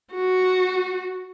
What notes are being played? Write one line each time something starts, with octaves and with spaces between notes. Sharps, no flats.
F#4